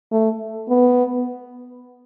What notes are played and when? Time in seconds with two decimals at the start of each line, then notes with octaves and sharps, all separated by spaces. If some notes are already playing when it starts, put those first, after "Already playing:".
0.12 A3
0.69 B3